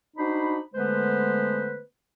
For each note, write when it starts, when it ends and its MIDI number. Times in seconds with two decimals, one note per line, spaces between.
0.17 0.57 62
0.17 0.57 63
0.17 0.57 66
0.17 0.57 72
0.17 0.57 83
0.75 1.80 50
0.75 1.80 56
0.75 1.80 57
0.75 1.80 59
0.75 1.80 71
0.75 1.80 72